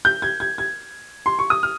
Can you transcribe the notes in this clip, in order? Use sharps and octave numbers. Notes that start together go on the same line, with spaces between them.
G6
G#6
G#6
G#6
C6
C#6
D#6
F6